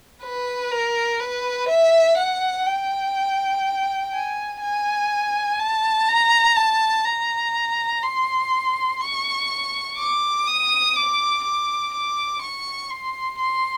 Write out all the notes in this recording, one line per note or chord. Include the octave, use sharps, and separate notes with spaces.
B4
A#4
B4
E5
F#5
G5
G#5
G#5
A5
A#5
A5
A#5
C6
C#6
D6
D#6
D6
D6
D6
C#6
C6
C6